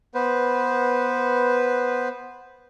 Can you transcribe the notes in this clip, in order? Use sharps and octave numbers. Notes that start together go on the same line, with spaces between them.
B3 B4 C5